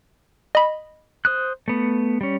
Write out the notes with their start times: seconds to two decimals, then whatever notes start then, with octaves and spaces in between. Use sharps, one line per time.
0.55 D#5 B5
1.25 C5 D#6 F#6
1.68 A3 B3
2.21 G3 C#4